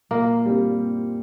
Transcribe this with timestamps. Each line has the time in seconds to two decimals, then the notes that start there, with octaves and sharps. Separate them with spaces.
0.11 A#2 A#3
0.45 G3 C4